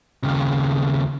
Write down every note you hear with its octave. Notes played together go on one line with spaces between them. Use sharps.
D#2 C#3